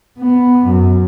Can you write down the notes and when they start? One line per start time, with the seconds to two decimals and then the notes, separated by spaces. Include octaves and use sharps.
0.18 B3
0.67 F#2